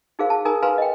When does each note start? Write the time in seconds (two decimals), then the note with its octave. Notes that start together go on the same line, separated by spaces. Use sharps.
0.19 D#4 F#4 G#4 A#4 C5 F5
0.30 A5
0.45 D#4 G#4 A#4 G#5 A#5 D#6
0.63 B4 F5 G#5 A#5 C6
0.78 D#5 G5